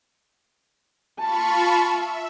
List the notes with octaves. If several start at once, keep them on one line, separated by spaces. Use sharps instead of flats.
F4 A5 B5 C#6
E5